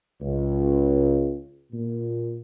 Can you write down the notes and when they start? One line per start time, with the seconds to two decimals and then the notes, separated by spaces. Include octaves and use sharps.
0.21 C#2
1.73 A#2